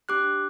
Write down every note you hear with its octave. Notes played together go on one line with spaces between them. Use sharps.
D4 G4 D6 F#6